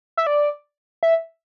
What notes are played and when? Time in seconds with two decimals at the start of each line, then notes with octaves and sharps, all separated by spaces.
0.17 E5
0.27 D5
1.03 E5